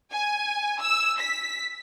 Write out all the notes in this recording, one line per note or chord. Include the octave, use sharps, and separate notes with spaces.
G#5
E6
B6